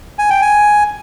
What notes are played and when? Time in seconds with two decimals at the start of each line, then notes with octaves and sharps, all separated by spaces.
0.19 G#5
0.30 G5
0.41 G#5